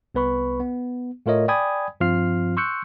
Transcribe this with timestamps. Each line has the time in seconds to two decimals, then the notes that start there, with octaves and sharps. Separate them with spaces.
0.14 C2 B3 B4 B5 C#6
0.60 B3
1.26 A2 A3 F4 A#4 C#5 D#5
1.48 D5 G5 G#5 B5 D#6 G#6
2.00 G2 F3 C4 F4 F6 C7
2.57 C6 C#6 E6 F#6 G6 C#7